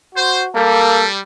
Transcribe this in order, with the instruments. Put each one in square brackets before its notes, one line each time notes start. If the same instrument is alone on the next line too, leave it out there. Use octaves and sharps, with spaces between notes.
[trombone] F#4 [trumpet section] C5
[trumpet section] G3 [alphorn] A#3 [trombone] A4